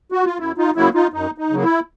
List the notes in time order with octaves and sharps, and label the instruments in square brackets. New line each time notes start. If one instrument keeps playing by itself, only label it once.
[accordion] F#4
F4
F#2 E4
D#4 F4
C#3 F#3 A#3 E4
D#4 F4
F#2 D#4
D#4
C#3 F#3 A#3
E4